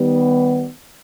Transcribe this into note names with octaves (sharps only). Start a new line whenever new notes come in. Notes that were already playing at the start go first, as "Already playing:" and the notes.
Already playing: D#3 G3 B3